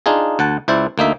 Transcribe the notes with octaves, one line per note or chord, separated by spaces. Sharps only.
D4 D#4 F4 G#4
D2 F#5 A5
C#2 E4 C5 D5
D2 A#3 D#4 E5